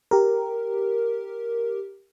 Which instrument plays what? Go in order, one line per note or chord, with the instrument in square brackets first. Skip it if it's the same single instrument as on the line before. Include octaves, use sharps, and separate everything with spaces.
[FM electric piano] G4 A#4